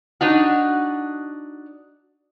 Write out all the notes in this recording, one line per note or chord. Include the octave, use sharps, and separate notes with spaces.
D4 D#4 F#4